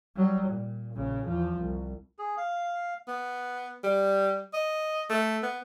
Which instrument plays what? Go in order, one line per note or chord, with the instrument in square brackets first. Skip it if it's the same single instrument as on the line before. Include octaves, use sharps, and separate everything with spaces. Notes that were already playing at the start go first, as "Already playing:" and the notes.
[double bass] F#3 G3
A#2
A#1 C#3
E2 F3
C2
[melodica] G#4
F5
[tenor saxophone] B3
G3
D#5
A3
B3